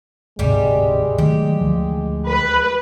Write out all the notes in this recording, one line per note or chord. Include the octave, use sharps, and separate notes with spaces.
D1 G#2 C3 G3 G#3 G4
D#3 F#3 A3 G4
D2 F3
B4